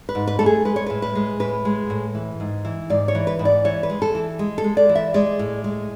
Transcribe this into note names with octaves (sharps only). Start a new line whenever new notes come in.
B4
G#2
B4
A3 A4
G#4
G#3 B4
C#5
A2 B4
B4
G#3
A2 B4
G#3
A2
E3
G#2
E3
G#2 D5
C#5
E3
B4
G#2
D5
E3 C#5
B4
G#3
A4
E3
G#3
A4
G#3
D5
E3
E5
G#3 D5
A2
G#3